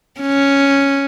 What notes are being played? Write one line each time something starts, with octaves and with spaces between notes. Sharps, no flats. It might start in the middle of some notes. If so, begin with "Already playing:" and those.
C#4